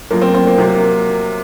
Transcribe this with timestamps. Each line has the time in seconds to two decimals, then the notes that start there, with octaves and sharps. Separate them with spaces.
0.11 F#2 F3 A#3
0.22 C4
0.34 C4
0.46 A#3
0.58 C3 F#3 A#3